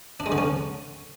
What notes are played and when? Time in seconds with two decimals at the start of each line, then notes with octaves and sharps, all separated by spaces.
0.20 D4
0.26 G#3
0.32 D3
0.38 C#4